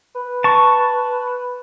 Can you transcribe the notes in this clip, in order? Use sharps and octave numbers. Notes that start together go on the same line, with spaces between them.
B4
A5 C#6